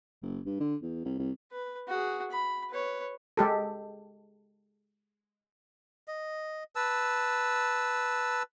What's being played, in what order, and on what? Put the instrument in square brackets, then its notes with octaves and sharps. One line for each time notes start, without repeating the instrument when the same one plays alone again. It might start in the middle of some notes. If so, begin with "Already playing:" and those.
[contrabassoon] F#1
G2
D3
E2
C2
C2
[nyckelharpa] B4
F#4 G#4
B5
B4 C#5
[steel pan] G#3 G4 A4
[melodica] D#5
B4 A5 E6